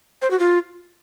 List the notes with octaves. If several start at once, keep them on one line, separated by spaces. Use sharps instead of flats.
C5
F#4
F4